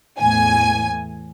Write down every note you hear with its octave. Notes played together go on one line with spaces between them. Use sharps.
E2 A2 G#5